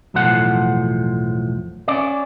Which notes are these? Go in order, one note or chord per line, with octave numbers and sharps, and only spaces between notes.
B1 E2 A2 F3 F#5
C#4 D5